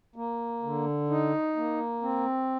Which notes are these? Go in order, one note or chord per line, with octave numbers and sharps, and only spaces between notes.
A#3
D3
D#4
A#3
C4